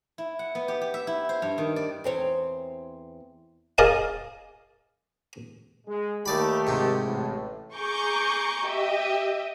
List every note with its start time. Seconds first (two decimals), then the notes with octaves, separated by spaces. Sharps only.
0.18 E4
0.39 F#5
0.55 B3
0.68 G4
0.81 G4
0.94 E5
1.07 E4
1.29 C5
1.42 G2
1.58 D#3
1.76 D5
2.04 E2 C4 C#5
3.78 G#4 A#4 D5 D#5 F5
5.87 G#3
6.26 D#2 D#3 A3 G4 D5 B5
6.67 G#2 C3
7.04 A1 A2
7.75 G#4 A#5 C#6 D6 G6
8.66 G4 D#5 E5